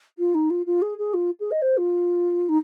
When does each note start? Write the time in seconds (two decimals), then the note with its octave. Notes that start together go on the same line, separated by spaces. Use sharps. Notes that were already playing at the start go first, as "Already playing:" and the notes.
0.18 F4
0.34 D#4
0.50 F4
0.66 F4
0.81 G#4
0.98 G#4
1.13 F4
1.40 G#4
1.51 D#5
1.61 C5
1.77 F4
2.48 D#4